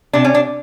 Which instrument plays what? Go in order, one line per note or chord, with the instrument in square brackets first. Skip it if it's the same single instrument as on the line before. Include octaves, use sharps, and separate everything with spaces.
[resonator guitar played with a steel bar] C3 D4
C#4
D4